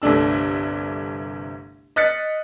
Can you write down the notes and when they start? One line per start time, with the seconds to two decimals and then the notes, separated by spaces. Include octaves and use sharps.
0.02 G1 C2 A3 D4 E6
1.96 D#5 F6 F#6 A6 B6 C#7